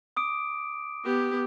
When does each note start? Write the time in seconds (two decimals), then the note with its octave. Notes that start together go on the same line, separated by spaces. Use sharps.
0.17 D6 D#6 D7
1.05 B3 G4